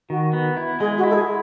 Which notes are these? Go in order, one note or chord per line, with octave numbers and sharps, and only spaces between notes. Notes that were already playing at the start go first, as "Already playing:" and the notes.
D#3 F#4
B3
E4
G#3 G#4
F#4
E4
A4
G#4